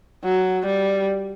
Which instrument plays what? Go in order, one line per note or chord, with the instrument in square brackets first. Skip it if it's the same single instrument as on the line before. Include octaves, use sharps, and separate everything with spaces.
[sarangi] F#3
G3